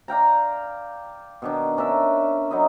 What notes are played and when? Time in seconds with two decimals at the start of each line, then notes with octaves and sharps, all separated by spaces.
0.08 D5 F5 G5 A#5
1.42 B2 D#3 D4
1.77 C#4 D4 A#4 E5
2.51 F#3 D#4 E4 D#5